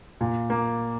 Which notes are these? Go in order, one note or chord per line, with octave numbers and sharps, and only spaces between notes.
A#2
A#3